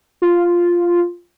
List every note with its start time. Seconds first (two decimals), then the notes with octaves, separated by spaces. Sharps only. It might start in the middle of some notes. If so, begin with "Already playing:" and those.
0.22 F4